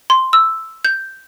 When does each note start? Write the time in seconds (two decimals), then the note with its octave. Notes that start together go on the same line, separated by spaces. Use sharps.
0.10 C6
0.33 E6
0.85 G6